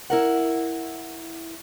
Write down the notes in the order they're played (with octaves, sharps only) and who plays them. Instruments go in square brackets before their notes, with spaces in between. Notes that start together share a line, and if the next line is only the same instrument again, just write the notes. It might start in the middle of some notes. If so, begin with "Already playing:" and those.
[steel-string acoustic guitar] E4 A#4 F#5